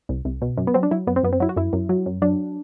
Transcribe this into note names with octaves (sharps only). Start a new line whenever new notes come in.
C2
C2
B2
F#2
B3
F#3 C4
D4
F#3 E4
F#2 B3
C4
F#2 B3
C4
F#3 E4
F#4
F#2 E4
F#2
F#3
F#2
F#3 D4